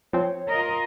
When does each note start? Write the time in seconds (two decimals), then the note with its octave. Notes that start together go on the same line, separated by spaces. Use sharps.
0.13 F3 C4 C#5
0.49 F4 A#4 D#5